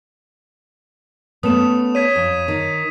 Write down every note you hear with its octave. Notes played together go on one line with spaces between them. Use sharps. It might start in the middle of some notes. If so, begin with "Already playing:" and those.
A3 B3 C#4 D#6 E7
C#5 G#6 B6 D#7
F2
D#3